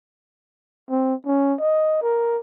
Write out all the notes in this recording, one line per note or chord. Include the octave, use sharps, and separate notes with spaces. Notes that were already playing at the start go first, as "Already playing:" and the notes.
C4
C#4
D#5
A#4